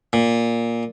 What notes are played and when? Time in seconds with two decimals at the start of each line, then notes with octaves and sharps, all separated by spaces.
0.13 A#2